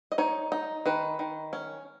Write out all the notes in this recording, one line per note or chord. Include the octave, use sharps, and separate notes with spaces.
D#5
D#4 C#5
D#4
D#3 B4
D#3
C#4